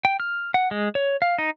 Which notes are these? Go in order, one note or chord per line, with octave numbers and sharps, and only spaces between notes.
G5
F6
F#5
G#3
C#5
F5
D#4